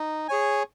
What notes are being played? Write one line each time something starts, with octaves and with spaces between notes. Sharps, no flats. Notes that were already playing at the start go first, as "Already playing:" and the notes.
Already playing: D#4
G#4 C#5 G#5